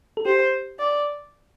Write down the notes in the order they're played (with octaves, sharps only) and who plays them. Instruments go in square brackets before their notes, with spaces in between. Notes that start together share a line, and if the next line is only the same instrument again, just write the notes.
[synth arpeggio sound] A4
[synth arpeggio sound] G4 [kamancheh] C5
[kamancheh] D5